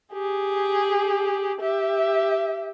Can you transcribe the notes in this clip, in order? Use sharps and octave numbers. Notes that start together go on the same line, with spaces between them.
G4 G#4
G4 E5